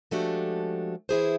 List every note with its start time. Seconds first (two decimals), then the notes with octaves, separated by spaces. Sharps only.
0.11 F3 G#3 A3 D4 F#4 G4
1.09 E3 E4 G#4 C5